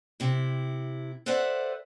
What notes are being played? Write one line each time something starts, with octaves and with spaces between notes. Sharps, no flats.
C3 E4
A4 B4 C5 D5 E5 F#5